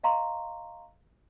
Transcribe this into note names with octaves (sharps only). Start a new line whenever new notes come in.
D#5 F5 A#5 C6 C#6